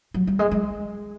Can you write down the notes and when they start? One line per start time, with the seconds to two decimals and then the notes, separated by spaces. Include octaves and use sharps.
0.14 F#3
0.27 G3
0.39 G#3
0.51 G#3